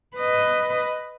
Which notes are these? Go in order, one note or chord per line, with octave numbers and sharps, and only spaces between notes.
B4 D#5